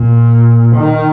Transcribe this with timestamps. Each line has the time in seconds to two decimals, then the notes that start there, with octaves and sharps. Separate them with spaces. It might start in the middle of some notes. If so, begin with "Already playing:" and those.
Already playing: A#2
0.76 D#3